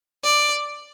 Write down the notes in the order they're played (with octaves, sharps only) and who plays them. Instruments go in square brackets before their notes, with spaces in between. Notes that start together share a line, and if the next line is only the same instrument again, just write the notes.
[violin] D5